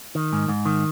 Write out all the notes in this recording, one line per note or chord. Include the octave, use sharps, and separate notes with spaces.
D#3
G#2
G#2
D#3